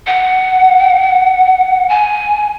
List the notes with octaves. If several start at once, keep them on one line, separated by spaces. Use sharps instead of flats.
F#5
G#5